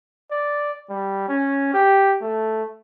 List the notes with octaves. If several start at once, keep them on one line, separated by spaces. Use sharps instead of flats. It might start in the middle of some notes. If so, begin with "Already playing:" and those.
D5
G3
C#4
G4
A3